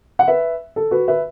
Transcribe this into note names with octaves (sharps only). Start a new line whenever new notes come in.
F#5
B4 E5
A4
F#4 B4
B4 E5